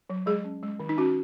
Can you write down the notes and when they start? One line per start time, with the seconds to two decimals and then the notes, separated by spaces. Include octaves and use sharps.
0.10 F#3
0.26 G#3 G#4
0.44 C#4
0.63 G#3
0.80 D#3
0.89 D#4
0.97 C#4 F#4